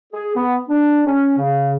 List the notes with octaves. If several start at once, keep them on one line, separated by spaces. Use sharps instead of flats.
G#4
B3
D4
C#4
C#3